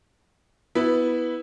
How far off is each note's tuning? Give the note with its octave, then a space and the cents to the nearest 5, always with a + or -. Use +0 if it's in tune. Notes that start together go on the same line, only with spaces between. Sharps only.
B3 +0 E4 -10